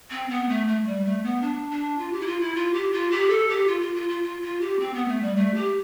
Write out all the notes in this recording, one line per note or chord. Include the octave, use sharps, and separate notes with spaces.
C4
B3
A3
A3
G3
A3
B3
D4
D4
F4
G4
E4
F4
E4
F4
G4
F4
G4
A4
G4
F4
F4
F4
F4
F4
F4
G4
C4
B3
A3
G3
A3
G4